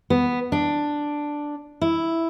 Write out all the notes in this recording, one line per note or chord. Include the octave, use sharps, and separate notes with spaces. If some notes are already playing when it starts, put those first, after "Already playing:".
B3
D4
E4